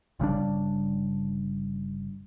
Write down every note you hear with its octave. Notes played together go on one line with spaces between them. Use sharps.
G1 C#3 G3 D4